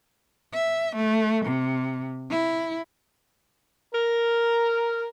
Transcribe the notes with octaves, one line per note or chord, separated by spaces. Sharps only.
E5
A3
C3
E4
A#4